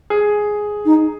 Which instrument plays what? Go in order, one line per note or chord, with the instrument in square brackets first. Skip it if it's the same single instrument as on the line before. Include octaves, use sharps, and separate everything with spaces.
[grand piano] G#4
[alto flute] D#4